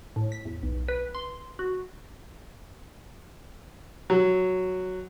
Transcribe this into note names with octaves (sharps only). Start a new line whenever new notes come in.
A2
B6
E2
B1
B4
C6
F#4
F#3